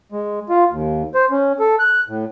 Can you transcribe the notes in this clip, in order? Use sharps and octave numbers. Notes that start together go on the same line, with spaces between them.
G#3
F4
D#2
C5
C#4
A4
F#6
A2